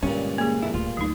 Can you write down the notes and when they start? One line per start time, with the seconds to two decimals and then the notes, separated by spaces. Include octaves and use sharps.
0.03 G2 A#2 D3 G#3 C#4
0.38 A#3 G#4
0.62 F2 A2 E4
0.74 D1 F4
0.97 D2 F#3 D#4